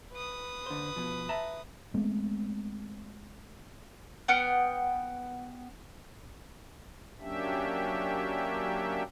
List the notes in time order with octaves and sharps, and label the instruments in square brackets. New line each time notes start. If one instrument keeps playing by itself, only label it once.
[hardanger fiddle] B4 D#6
[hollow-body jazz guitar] D3 C5
B2 F3
E5 A5 A#5
[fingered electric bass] G#3 A3 B3 C4
[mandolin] B3 F#5 G5 F6
[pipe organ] F#3 A#3 C#4 D4 G4 E5